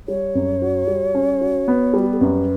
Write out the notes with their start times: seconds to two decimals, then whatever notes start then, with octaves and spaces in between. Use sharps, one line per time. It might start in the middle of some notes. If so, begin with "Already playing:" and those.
0.08 G3 C#5
0.35 F#2
0.62 F#4
0.87 G3
1.15 C#4
1.41 F#4
1.68 B3
1.93 G3
1.99 F#4
2.06 G4
2.13 A4
2.20 F#2 B4